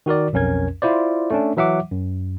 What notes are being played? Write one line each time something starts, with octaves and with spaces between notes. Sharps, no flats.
D#3 F#4 A#4 D5
B1 F2 C#4 A#4 G#6
E4 F4 C5 D5
A3 C#4 D4
E3 F#3 E5 F#5 D6
F#2